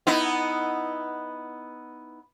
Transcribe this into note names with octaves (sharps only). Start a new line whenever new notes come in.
B3 D#4 E4